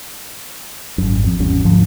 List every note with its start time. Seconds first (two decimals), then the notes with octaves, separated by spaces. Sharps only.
0.98 G#1 F#2
1.24 F2
1.39 G#1 E2 G3 C#4
1.65 D2 G#2 F3